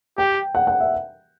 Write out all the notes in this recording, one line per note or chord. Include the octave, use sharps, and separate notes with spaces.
G4 G5
F#5
F#5
E5